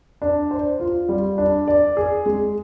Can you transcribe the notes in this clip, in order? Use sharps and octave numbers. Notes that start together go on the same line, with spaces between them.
D4
C5
F4
G3
D4
D5
G#4
G#3